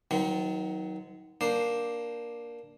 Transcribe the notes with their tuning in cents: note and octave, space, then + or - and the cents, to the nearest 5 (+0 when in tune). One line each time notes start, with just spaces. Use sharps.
D#3 +30 F#3 +0 C4 -30
A#3 +10 D4 +0 C5 +0